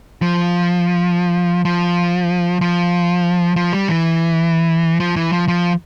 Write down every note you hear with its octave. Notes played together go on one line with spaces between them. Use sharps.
F3
F3
F3
F3
G3
E3
F3
E3
F3
F3